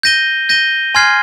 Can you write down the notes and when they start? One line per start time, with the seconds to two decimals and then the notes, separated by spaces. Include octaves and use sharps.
0.03 G6 A#6 D#7 G7
0.49 G6 A#6 D#7 G7
0.95 G#5 C6 F6 G#6 C7